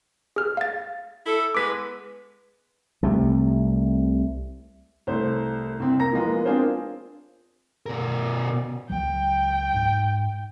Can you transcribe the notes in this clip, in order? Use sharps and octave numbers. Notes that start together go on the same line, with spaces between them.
G#4 F6
F5 A6
E4 A4
G#3 B3 B4 D6 B6
C2 C3 A3
C2 A3 C5
C2 C4
A#3 A#5 A#6
E3 F3 G#3 A#3 B3 F4
C4 D4 F4 G#4 A#4 C5
B2 A#4
C#2 F#3 G5
G#2